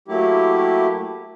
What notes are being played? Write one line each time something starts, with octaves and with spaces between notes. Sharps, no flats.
F#3 A3 A#3 E4 G4